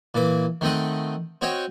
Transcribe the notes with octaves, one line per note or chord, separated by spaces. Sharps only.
A#2 E3 D6
D#3 A3 C4 D#5 F#5
C4 F#4 C#5 D#5 G5